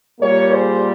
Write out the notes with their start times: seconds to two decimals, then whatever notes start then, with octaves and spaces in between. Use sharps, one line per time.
0.19 A#2 G3 A#3 A#4 C#5
0.52 G#4 C5